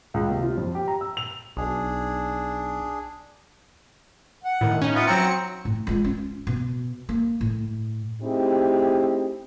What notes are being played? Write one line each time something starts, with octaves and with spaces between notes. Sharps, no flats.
C#2
C3
F4
F2
G4
A#5
E6
F7
B1 D4 G#4
F#5
A2 D#3
C#4 D#4
B3 E4 F4
F#3 C4 A#5 C#7
A2
G#3 F4
C#4
B2
A#3
A2
A3 C4 D#4 E4 G4 G#4